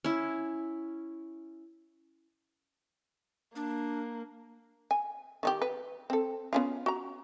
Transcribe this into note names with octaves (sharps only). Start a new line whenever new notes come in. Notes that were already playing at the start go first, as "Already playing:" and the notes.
C#4 E4
A#3 D4
G#5
D#3 D#4 G4
B4
C4 A4
B3 C#4 F4
F#4 A#5